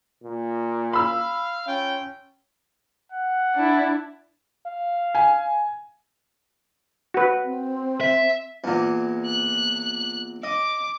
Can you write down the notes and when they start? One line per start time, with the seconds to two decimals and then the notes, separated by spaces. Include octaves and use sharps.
0.24 A#2
0.93 F5 B5 E6
1.68 C#4 F4 G5
3.12 F#5
3.55 D4 E4
4.66 F5
5.15 G#5
7.14 F#4 B4
7.45 C4
8.01 E5
8.64 E2 A#2
9.25 F#6
10.43 D#5 D6